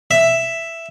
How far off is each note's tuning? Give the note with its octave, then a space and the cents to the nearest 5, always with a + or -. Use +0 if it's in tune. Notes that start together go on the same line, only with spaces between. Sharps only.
E5 +5